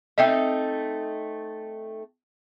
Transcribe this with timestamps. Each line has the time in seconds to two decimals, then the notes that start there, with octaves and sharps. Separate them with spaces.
0.18 A3 C4 D#4 D#5 E5 G5